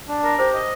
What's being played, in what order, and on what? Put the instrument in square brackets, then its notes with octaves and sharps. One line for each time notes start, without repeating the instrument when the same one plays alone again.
[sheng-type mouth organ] D4
A#4
[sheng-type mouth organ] G4 [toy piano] C5
[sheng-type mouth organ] D#5